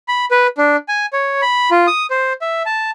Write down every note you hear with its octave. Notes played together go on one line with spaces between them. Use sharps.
B5
B4
D4
G#5
C#5
B5
F4
D#6
C5
E5
A5